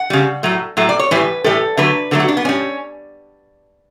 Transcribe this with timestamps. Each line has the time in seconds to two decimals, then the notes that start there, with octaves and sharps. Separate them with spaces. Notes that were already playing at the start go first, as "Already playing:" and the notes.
Already playing: F#5
0.10 C#3 G3
0.43 A2 F#3 A3
0.77 A2 F#3 A3
0.89 D5
0.99 C#5
1.11 A2 E3 G3 B4
1.44 A2 E3 G3 A4
1.77 D3 F#3 A3 B4
2.11 D3 F#3 A3 A4
2.20 F#4
2.28 D4
2.37 B3
2.45 A2 G3 C#4